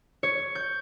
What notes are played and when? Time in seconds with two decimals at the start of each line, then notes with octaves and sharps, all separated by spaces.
0.23 C#5
0.55 G6